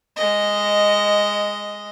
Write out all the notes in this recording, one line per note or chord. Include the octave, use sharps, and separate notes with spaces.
G#3 D#5